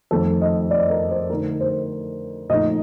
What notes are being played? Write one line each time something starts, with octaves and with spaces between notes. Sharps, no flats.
F2 D#3 A3 A4
D#5
D5
A#4
C5
D3 A3 D#4 A#4
C5
A#2 F3 A3 D#4 D#5